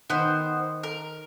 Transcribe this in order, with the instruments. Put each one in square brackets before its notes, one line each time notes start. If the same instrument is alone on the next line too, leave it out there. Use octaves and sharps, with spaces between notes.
[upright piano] D#3 [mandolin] B3 C5
[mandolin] A#4